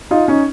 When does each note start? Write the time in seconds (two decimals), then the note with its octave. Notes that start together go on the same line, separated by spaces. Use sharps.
0.11 D#4 F4
0.28 C#4 D#4